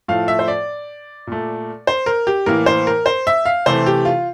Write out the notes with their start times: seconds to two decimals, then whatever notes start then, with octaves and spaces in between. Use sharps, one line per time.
0.08 A2 F3 A3 F5
0.28 E5
0.39 C5
0.48 D5
1.27 A#2 A3
1.87 C5
2.06 A#4
2.27 G4
2.46 A2 E3 A#3 A#4
2.66 C5
2.87 A#4
3.06 C5
3.27 E5
3.46 F5
3.66 C3 E3 A3 C5
3.86 G4
4.05 F4